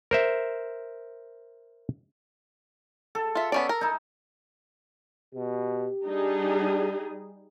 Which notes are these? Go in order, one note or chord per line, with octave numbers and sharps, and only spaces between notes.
A#4 C5 E5
A4
F4 E5
B3 C#4 D5
A#4
D#4 E4
B2 G4
G3 D4 D#4 G#4